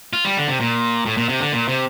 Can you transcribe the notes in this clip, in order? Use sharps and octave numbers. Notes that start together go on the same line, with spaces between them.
F4
G3
D3
C3
A#2
A2
A#2
C3
D3
A#2
C3